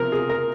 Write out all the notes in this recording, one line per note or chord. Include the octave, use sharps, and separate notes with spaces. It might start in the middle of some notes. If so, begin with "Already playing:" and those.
Already playing: C3 F3 C4 A#4
G#4
A#4